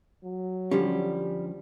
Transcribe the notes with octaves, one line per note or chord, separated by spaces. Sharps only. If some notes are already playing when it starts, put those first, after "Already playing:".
F#3
D3 F3 G3 C#4